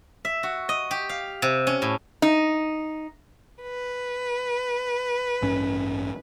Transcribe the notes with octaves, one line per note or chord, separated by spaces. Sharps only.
E5
F#4
D#5
G4
F5
C3
C#4
A2
D#4
B4
A1 G2 C#4